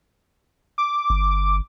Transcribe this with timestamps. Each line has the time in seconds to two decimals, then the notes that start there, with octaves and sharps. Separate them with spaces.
0.78 D6
1.10 G1